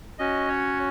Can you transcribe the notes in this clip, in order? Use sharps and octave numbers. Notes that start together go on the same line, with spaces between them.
C#4 F#4 D#5
C#5